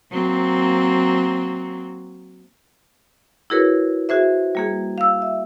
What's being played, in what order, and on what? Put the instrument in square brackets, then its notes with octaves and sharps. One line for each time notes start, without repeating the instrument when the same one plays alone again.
[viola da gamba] F#3 A#3 C4
[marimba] E4 F#4 G#4 A#4 B4 C#5
F#4 G#4 C5 E5
G3 A#3 G#4
F5 E6
E5